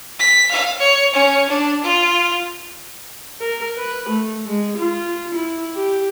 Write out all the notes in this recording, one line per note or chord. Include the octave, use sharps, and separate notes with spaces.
B6
F5
C#5
C#4 C#5
D4
F4
A#4
B4
A3
G#3
F4
E4
G4